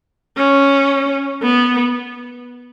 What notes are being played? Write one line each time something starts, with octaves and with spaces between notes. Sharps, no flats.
C#4
B3